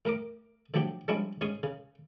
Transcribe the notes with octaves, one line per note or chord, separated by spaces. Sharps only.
A2 A#4 A#5 D6
A2 F3 F#3 D4 G4
F3 G3 G#3 C#4 D4 E4
G#2 C#4 G#4 C6 D#6
C#3